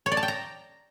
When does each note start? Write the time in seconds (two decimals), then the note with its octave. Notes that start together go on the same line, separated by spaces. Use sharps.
0.06 C#5
0.12 D5
0.17 A5
0.23 G5
0.28 A#5